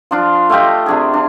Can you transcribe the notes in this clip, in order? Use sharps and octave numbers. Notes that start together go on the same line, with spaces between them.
F3 D4 F4
A3 F4 G4 D#5
C3 D4 G#4
D4